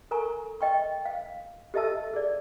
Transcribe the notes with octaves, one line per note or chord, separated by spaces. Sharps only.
A4 A#4 G#5 A#5 C#6
D#5 G5 C#6
F5
G4 A4 D#5 E5 A5 E6
G#4 D5